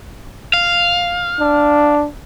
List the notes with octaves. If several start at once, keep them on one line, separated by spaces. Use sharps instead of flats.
F5
D4